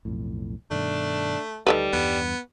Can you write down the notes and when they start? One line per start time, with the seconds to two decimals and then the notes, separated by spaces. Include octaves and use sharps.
0.05 B1 F2 A2
0.71 G2 B2 D#3 A3 D4
1.67 D2 D#3 G3 A4 B4
1.93 E2 G2 B3